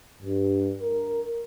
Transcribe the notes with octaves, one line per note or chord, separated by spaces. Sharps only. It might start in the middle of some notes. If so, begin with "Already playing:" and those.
G2
A#4